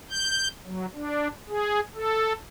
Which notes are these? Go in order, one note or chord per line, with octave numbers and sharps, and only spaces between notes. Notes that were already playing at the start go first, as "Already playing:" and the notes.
G6
F#3
D4
G#4
A4